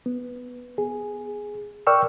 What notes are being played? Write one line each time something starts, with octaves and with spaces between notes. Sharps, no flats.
B3
G#4
A#4 D5 G5 C#6 E6 F6